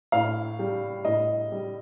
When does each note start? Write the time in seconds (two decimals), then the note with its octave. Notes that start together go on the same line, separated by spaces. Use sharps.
0.12 A2 F5
0.59 G3
1.05 A2 D#5
1.52 G3